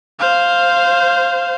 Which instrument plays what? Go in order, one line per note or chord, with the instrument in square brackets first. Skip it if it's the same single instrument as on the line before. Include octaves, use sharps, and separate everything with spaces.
[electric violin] C5 F5